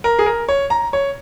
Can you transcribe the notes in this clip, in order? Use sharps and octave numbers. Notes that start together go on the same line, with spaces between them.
A#4
G#4
A#4
C#5
A#5
C#5